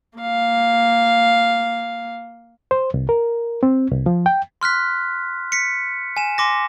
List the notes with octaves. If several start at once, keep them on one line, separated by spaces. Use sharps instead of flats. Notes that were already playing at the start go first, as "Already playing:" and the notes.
A#3 F5
C5
C2
A#4
C4
C2
F3
G5
C6 F6 F#6 B6
B6 C#7
G#5 E7
G#5 C6 D6 A#6